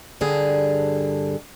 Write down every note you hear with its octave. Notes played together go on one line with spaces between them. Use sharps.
G2 D3 G#4